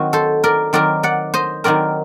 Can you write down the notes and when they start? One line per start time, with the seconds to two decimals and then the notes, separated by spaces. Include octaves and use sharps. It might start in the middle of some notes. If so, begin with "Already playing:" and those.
Already playing: D#3 F#3 C4 F#4
0.13 A4 C5
0.44 A#4 D5
0.73 D#3 F#3 C4 A#4 D5
1.03 D5 F#5
1.34 C5 D#5
1.64 D#3 F#3 C4 A#4 D5